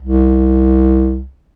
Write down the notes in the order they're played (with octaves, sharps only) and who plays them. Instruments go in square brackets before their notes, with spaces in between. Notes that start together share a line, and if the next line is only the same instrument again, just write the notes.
[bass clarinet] C2